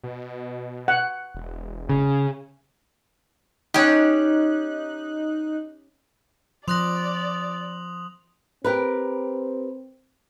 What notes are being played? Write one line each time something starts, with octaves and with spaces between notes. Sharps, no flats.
B2
F#5
E1
C#3
C#4 D#4 G4 F#6
F3 D5 C6 D#6 F#6 A#6 F7 F#7
C4 G4 A#4 B4